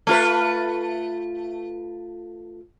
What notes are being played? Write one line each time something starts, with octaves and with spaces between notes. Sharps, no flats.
A3 F4 B4